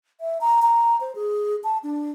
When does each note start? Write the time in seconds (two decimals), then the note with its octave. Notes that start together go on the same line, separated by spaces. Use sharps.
0.20 E5
0.41 A#5
0.62 A#5
1.01 C5
1.15 G#4
1.64 A5
1.83 D4